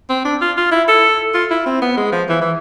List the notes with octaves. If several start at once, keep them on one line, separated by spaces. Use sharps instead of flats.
C4
D4
F4
F4
E4
A4
F4
E4
C4
B3
G#3
F3
E3
E3